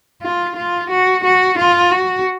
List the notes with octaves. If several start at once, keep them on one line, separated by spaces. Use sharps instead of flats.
F4
F4
F#4
F#4
F4
F#4